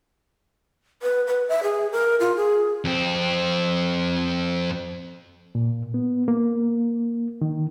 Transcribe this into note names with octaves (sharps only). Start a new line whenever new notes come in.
B4
B4
E5
G#4
A#4
F4
G#4
F2 C4
A#2
B3
A#3
D#3